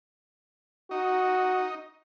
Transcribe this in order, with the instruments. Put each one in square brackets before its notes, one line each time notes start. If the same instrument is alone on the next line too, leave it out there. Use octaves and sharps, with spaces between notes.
[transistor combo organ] D#4 [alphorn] F#4